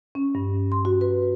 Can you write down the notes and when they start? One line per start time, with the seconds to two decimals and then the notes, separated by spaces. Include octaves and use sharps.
0.15 C#4
0.35 G2
0.72 C6
0.85 F#4
1.01 B4